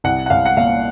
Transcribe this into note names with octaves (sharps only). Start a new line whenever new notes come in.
C2 F#5
F#5
C2 F5
F#5
A#2 F5